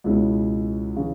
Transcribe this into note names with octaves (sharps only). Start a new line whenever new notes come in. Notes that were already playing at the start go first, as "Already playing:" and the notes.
C#2 B2 G#3 C#4 E4
C#3 E3